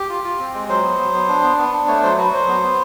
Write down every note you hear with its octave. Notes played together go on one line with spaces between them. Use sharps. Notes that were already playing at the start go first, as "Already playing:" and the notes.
Already playing: G4
F4
F4
C4
G#3
F#3 C5
B3
F#3
B3
D4
B3
B3
D4
A3 C#5
F#3 C5
F#4 B4
F#3 C5
B3
B3